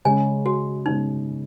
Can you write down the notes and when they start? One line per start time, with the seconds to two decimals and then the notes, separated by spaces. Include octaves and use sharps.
0.05 C#3 G#3 C#4 G#5
0.46 F#4
0.86 C#3 G#3 C#4 D#4